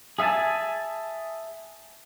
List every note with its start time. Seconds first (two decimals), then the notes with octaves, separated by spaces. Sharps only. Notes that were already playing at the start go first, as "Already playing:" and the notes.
0.19 G#4 E5 F5 G#5 A5